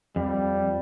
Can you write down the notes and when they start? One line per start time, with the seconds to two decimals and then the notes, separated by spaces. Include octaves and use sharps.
0.16 F2 G3